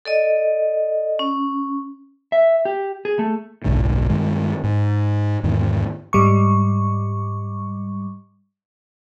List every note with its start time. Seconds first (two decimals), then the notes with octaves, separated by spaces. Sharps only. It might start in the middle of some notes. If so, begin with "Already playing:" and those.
0.05 A4 D5 D#5
1.19 C#4
2.32 E5
2.65 G4
3.05 G#4
3.19 A3
3.64 F#1 B1 G#2 D3
4.10 G2 D#3 G#3
4.64 G#2
5.43 E2 G#2 D#3
6.13 G#2 G3 C#6